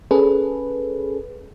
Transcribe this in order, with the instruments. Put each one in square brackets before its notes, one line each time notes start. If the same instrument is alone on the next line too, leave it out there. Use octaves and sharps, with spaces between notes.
[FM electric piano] C#4 G#4 A4 B4